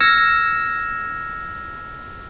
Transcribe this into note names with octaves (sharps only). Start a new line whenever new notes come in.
E6 F6 G#6 A#6 C#7 E7